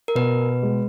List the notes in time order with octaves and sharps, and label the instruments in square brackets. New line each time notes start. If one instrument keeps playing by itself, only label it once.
[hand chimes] A#4
[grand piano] B2 [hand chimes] B4
[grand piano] G#3